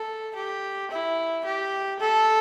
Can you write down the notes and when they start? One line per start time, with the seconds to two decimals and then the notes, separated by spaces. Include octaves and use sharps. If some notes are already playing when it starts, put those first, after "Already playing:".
Already playing: A4
0.36 G4
0.91 E4
1.45 G4
1.99 A4